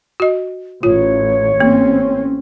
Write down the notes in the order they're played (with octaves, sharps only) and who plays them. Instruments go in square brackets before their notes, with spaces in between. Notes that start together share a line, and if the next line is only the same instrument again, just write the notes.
[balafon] F#4 D#5
[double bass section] A1 [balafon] F4 [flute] C#5
[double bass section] A1 C4 C#4 [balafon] A#3